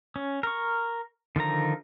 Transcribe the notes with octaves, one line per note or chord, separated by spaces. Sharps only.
C#4
A#4 C#6
D3 D#3 F3 A#5